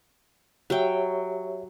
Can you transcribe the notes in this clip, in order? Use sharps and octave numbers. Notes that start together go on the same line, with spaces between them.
F#3 G4 C#5 E5 G5